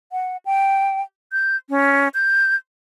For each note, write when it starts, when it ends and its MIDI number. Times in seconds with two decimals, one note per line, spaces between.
0.12 0.37 78
0.45 1.01 79
1.32 1.56 91
1.70 2.08 61
2.14 2.55 91